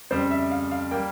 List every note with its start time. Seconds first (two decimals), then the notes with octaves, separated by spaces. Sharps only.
0.10 F2 C#3 G3 C5
0.31 E5
0.51 F5
0.71 F5
0.91 G3 A#3 G5